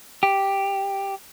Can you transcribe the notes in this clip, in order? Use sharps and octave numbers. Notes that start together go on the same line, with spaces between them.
G4